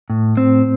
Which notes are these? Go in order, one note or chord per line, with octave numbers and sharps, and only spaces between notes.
A2
C4